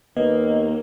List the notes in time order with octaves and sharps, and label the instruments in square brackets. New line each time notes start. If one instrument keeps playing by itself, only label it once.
[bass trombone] D#2 [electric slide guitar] A#3 [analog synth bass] B3 [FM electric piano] D#5